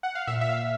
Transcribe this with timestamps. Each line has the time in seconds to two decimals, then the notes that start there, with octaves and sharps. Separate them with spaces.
0.03 F#5
0.15 F5
0.27 A#2 E5
0.41 E5
0.49 F5